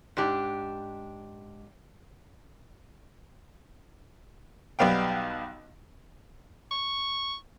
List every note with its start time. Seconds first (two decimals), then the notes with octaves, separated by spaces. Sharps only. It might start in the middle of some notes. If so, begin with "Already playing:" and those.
0.17 G#2 D4 G4
4.79 B1 G3 B3 F5 G5
6.71 C#6